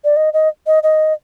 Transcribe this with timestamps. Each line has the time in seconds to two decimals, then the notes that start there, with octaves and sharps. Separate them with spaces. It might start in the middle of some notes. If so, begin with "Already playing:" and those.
0.04 D5
0.16 D#5
0.33 D#5
0.67 D#5
0.83 D#5